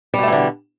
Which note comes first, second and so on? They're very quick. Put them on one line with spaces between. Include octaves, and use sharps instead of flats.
G3 B2 A3 E3 D3